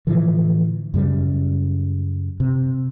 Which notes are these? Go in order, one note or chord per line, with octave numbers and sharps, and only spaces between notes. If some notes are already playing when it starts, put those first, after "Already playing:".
A2 D3 E3 F3
F#2 C#3 G3
C3